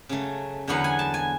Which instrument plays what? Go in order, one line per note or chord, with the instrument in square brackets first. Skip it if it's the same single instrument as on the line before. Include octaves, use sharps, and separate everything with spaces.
[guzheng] C#3 F#3 A3
E2 D3 F#3 B3 F#5
G#5
A5
G#5